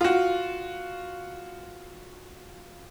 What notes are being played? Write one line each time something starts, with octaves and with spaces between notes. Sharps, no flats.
F4 F#4